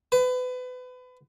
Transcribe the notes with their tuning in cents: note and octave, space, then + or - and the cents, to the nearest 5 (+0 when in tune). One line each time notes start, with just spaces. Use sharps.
B4 +30